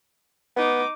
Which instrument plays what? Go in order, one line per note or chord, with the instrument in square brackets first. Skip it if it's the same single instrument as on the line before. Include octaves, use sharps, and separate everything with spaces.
[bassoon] B3 [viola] D#4 D6